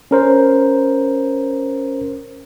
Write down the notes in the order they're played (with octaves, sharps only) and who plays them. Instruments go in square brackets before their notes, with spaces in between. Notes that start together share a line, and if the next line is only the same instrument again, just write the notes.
[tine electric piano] C#4 A#4 C5